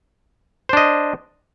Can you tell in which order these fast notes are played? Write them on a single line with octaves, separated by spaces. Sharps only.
C5 D4 D#5